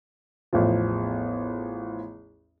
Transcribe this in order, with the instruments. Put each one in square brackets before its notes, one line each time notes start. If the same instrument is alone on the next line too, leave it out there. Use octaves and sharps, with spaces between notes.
[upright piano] A1 E2 F3